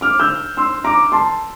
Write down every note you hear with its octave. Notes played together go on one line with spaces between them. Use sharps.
D6 F6
E6 G6
C6 E6
A#5 D6
A5 C6